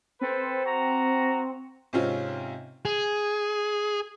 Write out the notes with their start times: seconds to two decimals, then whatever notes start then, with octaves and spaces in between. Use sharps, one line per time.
0.21 C4 A4 B4 C5
0.66 F#4 A#5
1.93 G#2 C3 C4 C#4 F4
2.85 G#4